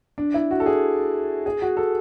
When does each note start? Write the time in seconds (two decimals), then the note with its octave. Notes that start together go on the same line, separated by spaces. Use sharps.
0.18 D4
0.34 E4
0.51 F#4
0.60 A4
0.66 G#4
1.46 G#4
1.62 F#4
1.77 A4